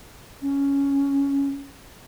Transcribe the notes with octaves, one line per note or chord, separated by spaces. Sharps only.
C#4